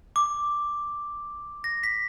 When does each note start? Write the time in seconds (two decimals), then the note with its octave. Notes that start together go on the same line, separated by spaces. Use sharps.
0.16 D6
1.64 A#6
1.83 B6